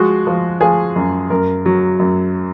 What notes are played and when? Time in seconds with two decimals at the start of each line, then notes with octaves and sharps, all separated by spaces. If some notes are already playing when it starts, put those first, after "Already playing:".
Already playing: F3 G#3 F#4
0.27 F3
0.61 F3 G#4
0.96 F#2
1.30 F#2 A#4
1.66 F#3
1.99 F#2